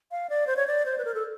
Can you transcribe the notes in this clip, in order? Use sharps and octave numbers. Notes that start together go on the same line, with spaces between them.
F5
D5
C5
C#5
D5
C5
B4
A#4
A4